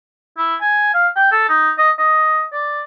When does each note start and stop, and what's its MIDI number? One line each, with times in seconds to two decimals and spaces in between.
0.38 0.56 64
0.61 0.94 80
0.94 1.08 77
1.16 1.31 79
1.32 1.46 69
1.49 1.71 63
1.78 1.91 75
1.99 2.43 75
2.53 2.82 74